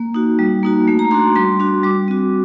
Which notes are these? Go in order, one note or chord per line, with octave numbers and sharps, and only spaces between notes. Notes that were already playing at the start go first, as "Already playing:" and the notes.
Already playing: A#3
D#4 F#4
G3
A#3 D#4 F#4
A3
A#5
D4 F#4 C6
G3 C6
D4 F#4
G3 D6
C4 F#4